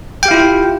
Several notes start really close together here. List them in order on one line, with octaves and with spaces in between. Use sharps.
G5 G4 F5 E4 F4